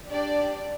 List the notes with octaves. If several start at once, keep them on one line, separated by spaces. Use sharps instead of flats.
D4 G4 D5